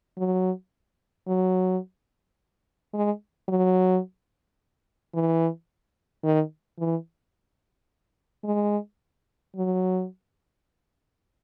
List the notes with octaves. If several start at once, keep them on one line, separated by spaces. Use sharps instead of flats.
F#3
F#3
G#3
F#3
E3
D#3
E3
G#3
F#3